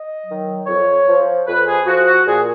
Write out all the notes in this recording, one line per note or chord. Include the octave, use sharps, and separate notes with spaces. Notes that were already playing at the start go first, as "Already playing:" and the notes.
Already playing: D#5
D#3 F#3
F2 C#5
F3
F2 B4
G#4
F3 F#4
F#4
A#2 G#4